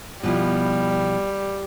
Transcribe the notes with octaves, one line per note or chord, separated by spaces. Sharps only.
B2 F3 G3 E4